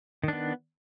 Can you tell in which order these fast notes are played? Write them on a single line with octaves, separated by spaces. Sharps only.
D#3 D4 B3